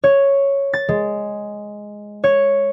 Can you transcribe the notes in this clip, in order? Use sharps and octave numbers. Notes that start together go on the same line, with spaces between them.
C#5
A6
G#3
C#5